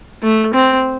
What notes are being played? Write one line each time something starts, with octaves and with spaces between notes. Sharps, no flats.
A3
C4